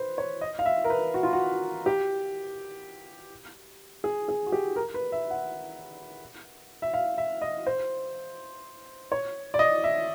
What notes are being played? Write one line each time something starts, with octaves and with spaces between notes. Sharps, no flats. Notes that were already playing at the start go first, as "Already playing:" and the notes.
Already playing: B4 C5
C#5
D#5
F5
E5
A#4
B4
F#4
F4
F#4
G4
G#4
G#4
F#4
G4
A#4
B4
E5
F#5
E5
F5
E5
D#5
C5
C#5
D5
D#5
E5